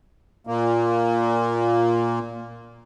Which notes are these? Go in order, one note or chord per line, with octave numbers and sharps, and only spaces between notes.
A#2 A#3